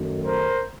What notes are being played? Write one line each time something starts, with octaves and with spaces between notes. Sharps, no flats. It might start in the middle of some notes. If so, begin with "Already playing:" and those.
Already playing: F#2 D#3 F#3 A3
A#4 C5